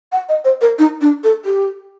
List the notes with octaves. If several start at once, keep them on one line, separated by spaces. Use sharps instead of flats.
F#5
D#5
C5
A#4
D#4
D4
A4
G4